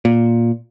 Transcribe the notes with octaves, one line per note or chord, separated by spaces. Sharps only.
A#2